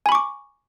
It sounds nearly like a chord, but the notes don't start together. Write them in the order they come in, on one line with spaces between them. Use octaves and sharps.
G#5 B5 C#6 D6